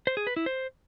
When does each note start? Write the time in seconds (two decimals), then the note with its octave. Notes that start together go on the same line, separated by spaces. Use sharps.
0.07 C5
0.17 G#4
0.27 B4
0.36 E4
0.46 C5